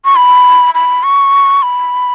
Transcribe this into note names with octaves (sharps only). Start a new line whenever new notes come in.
C#6
B5
B5
C#6
B5